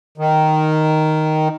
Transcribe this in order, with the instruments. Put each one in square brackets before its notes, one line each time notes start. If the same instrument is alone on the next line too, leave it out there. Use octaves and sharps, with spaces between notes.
[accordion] D#3